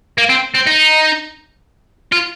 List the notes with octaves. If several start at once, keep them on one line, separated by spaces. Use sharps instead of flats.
A#3
C4
C4
D#4
F4